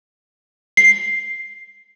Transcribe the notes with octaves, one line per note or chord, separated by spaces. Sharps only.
C7